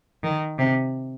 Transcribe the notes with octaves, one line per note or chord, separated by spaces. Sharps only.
D#3
C3